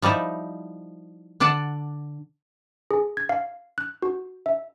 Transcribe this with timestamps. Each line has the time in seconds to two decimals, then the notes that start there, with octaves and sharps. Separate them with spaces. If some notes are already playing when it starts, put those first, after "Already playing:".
0.02 F3 G3 D#4 E4
1.40 D3 D4 D5 F#5 A5
2.91 G#4
3.17 G#6
3.29 F5
3.78 F#6
4.02 F#4
4.46 E5